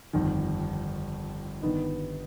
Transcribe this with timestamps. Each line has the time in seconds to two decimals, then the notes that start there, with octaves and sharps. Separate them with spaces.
0.13 G1 F2 D#3
1.62 G1 G2 D#3 B3 D#4